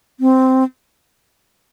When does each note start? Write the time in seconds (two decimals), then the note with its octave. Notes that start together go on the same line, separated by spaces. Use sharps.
0.20 C4